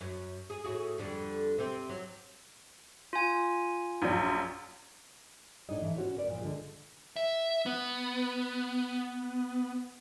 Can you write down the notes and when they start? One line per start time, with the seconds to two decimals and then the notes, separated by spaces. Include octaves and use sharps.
0.01 F#2
0.50 G#4
0.64 A2 F#4 G#4
0.98 F2 D3 G3
1.58 C3 C4
1.89 F#3
3.13 F4 G#5
4.02 A#1 F#2
5.69 A2 D4 D#4 C#5 D#5
5.82 A2 E3
5.97 C#4 E4 F#4 C5 C#5
6.16 C#3 A#3 B4 D5
6.29 A#2 F3
6.42 D3 G#3
7.16 E5
7.66 B3